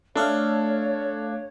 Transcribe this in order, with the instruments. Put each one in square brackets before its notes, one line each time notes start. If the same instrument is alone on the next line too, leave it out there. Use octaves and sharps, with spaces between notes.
[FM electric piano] A3 A4 F5 [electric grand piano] D4 [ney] C#5